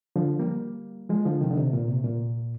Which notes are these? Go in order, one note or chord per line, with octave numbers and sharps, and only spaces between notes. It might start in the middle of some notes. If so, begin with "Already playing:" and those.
D3 F3
G3 A#3
F3 G#3
D3 F3
C3 D#3
D3
C3
A#2
C3
A#2